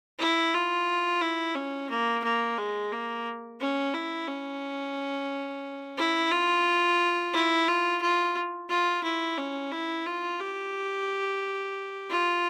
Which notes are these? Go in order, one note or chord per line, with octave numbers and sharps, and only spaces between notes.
E4
F4
E4
C#4
A#3
A#3
G#3
A#3
C#4
E4
C#4
E4
F4
E4
F4
F4
F4
E4
C#4
E4
F4
G4
F4